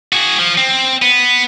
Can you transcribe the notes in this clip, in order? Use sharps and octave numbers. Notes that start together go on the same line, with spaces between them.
F#4 G#4
F3
C4
B3